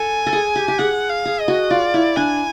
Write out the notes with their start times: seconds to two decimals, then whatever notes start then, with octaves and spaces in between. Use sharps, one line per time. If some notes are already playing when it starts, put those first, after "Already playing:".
Already playing: A4 G#5
0.26 A4
0.33 G#4
0.56 G4
0.68 G4
0.78 G#4 F#5
1.10 F5
1.25 G#4
1.40 D#5
1.48 F#4
1.70 F4 D5
1.94 E4
2.17 D4 G#5